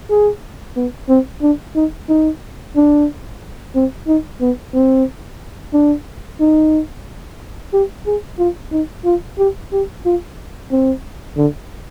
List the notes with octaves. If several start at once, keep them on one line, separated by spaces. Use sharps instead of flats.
G#4
B3
C4
D4
D#4
D#4
D4
C4
D#4
B3
C4
D4
D#4
G4
G#4
F4
D#4
F4
G4
G4
F4
C4
D3